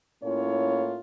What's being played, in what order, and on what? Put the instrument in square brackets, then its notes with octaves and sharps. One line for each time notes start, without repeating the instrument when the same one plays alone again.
[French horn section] A2 A#3 C#4 E4 F4 C#5